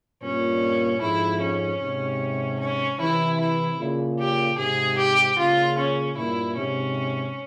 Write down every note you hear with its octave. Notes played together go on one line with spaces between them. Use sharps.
G2 A#2 C#4
F2 G#2 E4
C#4
G#2 C3
C#4
C3 E3 E4
E4
A#2 C#3
G4
G#2 C3 G#4
G4
A#2 C#3 F4
C#4
G2 A#2 E4
G#2 C3 C#4